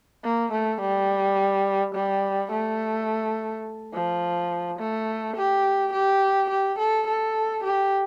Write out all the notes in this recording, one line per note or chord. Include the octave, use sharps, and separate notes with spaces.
A#3
A3
G3
G3
A3
F3
A3
G4
G4
G4
A4
A4
G4